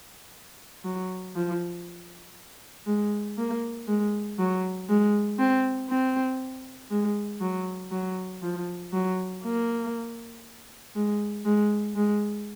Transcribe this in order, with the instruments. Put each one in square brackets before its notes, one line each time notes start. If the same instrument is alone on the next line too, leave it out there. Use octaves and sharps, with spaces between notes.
[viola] F#3
F3
G#3
A#3
G#3
F#3
G#3
C4
C4
G#3
F#3
F#3
F3
F#3
A#3
G#3
G#3
G#3